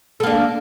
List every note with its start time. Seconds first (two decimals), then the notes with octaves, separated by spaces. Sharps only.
0.20 A4
0.23 A#3
0.27 D4